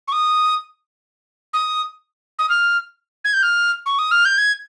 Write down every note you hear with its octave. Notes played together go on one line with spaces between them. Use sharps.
C#6
D#6
D#6
D#6
F6
G#6
G6
F6
C#6
D#6
F6
G6
G#6